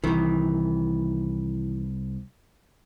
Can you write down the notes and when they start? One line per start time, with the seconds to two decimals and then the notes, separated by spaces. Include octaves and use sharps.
0.04 C2 D#3 E3